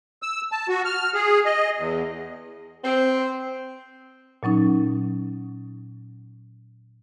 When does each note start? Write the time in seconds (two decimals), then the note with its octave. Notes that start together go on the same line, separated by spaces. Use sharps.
0.22 E6
0.52 A5
0.69 F#4
0.85 F6
1.14 G#4
1.45 D#5
1.78 E2
2.84 C4
4.43 A#2 F#3 C#4 D#4